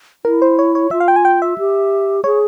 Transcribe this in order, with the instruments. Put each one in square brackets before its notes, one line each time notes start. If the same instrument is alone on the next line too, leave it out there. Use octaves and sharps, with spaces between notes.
[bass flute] E4 [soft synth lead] A#4
[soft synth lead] C5
C#5
C#5
[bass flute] F4 [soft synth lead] E5
[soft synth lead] F5
G5
G#5
G5
E5
[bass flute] G4
[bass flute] G#4 [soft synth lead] C#5